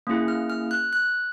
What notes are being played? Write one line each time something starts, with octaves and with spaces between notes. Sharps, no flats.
A#3 C#4 E4 G#4
F6
F6
F#6
F#6